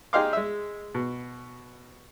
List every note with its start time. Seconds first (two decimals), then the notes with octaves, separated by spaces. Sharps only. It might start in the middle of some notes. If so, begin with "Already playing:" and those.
0.13 D#4 G4 G#4 F5 C6 D6
0.33 G#3 E5
0.95 B2